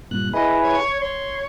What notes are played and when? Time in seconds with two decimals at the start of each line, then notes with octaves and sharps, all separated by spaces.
0.11 G2 A#2 F#6
0.33 E4 G#4 B4 D#5
0.62 C#5
1.02 C#5 C6